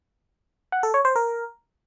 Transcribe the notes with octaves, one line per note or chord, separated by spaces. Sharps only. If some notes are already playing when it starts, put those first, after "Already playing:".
F#5
A4
C#5
C5
A#4